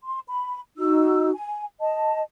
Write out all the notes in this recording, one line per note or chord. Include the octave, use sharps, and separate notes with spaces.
C6
B5
D#4 F#4 E6
G#5
D#5 A5